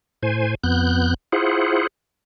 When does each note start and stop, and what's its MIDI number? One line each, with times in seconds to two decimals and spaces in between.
0.23 0.55 45
0.23 0.55 72
0.23 0.55 80
0.64 1.14 41
0.64 1.14 59
0.64 1.14 90
0.64 1.14 91
1.33 1.87 64
1.33 1.87 65
1.33 1.87 68
1.33 1.87 72
1.33 1.87 78